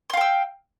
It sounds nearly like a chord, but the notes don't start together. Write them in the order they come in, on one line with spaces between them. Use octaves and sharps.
C6 F5 G5 E6